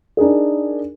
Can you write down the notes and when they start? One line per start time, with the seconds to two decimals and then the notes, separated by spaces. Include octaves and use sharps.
0.17 D4 D#4 G#4 A#4